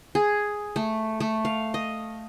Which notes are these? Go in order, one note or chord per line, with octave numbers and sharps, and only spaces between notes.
G#4
A3
A3
F5
D#5